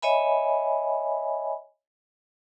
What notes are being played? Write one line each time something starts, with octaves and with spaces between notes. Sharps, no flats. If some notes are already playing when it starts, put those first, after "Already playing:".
C#5 D#5 E5 G#5 B5